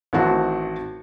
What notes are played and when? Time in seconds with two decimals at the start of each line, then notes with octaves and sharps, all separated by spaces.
0.13 A1 D#3 C4 F#4 A5